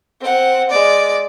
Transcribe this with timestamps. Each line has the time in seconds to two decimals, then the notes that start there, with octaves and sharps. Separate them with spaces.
0.20 C4 F#5
0.69 G#3 D5